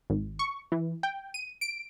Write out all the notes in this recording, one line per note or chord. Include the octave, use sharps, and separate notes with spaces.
G#1
C#6
E3
G5
D#7
D7